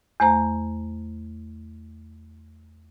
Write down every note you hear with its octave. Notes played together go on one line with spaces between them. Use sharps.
E2 A3 C5 A#5